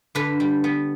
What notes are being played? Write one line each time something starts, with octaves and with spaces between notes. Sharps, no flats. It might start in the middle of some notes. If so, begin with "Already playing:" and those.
D3 B4
G3
B3